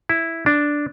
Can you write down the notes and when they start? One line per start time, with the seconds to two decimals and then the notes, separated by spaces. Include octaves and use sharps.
0.09 E4
0.46 D4